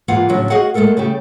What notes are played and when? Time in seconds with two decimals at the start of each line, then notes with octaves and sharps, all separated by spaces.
0.08 G#2 E3 A#3 F4 F5 F#5
0.29 A2 C#3 F3 F#3 C#4 D4
0.50 F#4 G#4 D#5 F5 F#5
0.74 G#3 A3 B3 A4 A#4
0.97 C#3 G3 A3 G4